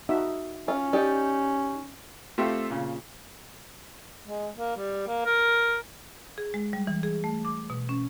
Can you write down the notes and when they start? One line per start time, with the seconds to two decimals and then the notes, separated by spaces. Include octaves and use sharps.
0.09 D#4 F#4 E5
0.68 C#4 F4
0.93 D#4 G4 D5
2.38 A3 C4 F4 G4 A4
2.70 A#2 C#3
4.25 G#3
4.56 A#3
4.77 G3
5.08 A#3
5.25 A#4
6.38 G#4
6.54 G#3
6.73 G3
6.87 E3
7.03 G#4
7.24 A3
7.45 D6
7.70 B2
7.89 C#4